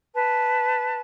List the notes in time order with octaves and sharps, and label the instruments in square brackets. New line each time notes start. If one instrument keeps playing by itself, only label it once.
[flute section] B4 A5